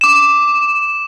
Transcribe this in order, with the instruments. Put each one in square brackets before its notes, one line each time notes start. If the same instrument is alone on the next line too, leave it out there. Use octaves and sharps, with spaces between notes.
[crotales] D6 E7